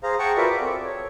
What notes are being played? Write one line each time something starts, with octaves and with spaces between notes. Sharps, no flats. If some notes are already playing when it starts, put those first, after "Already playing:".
G#4 C5 F5 A#5
G#4 F#5 G5 A5 A#5 C#6
F4 F#4 A#4 B4 D5 E5
D6
C4 A4
C#5